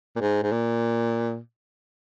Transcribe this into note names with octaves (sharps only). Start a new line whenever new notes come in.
A#2
G#2
G#2
A#2